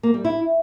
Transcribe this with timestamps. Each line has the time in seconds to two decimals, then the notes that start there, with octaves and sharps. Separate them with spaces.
0.03 A#3
0.14 G3
0.25 E4